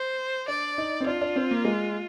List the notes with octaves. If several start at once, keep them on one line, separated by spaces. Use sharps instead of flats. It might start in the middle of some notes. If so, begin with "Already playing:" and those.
Already playing: C5
D4 D5
D#4
C4
D4 F4
D4
C4
A#3
G#3